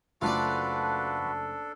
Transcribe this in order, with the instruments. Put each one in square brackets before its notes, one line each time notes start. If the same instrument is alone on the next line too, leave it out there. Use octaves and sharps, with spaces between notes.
[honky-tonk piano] F#1 A3 [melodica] D4 A4 [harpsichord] F4 D5 [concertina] F#4 B4